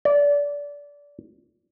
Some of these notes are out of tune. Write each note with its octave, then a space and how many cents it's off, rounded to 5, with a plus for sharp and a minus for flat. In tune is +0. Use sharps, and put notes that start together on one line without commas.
D5 -25